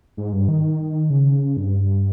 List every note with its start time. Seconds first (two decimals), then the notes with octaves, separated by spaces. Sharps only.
0.17 G#2
0.33 G2
0.48 D#3
1.10 C#3
1.57 G2